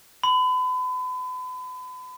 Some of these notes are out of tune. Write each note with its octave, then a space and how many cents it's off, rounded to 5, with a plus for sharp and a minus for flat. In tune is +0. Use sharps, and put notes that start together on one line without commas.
B5 +35